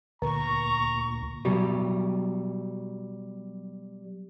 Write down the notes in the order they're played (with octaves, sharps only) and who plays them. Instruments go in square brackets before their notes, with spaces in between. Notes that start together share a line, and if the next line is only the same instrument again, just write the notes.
[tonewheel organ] D2 A#2 [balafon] D3 [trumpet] A#5 [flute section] C#6
[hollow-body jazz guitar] B2 F#3 G3